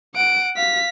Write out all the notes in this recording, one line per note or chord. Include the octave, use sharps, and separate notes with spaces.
F#5 D7
F5 B6